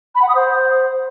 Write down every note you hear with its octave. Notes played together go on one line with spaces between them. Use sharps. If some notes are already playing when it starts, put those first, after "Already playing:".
B5
F#5
D#6
C5